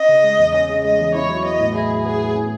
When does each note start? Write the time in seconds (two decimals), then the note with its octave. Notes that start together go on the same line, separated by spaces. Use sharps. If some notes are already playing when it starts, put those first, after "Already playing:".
Already playing: C#4 D#5
0.09 C#3
0.24 G#3
0.39 E2
0.54 C#4 D#5
0.70 C#3
0.84 G#3 D#5
1.00 E2
1.14 E4 C#5
1.30 F#3
1.45 B3 D#5
1.60 A2
1.75 E4 G#4
1.91 F#3
2.05 B3 G#4
2.21 A2
2.36 C#4